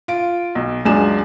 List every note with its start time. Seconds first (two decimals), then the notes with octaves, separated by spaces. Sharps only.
0.08 F4 D7
0.55 B1
0.85 C#2 F#2 G#3 D4 G#5 E7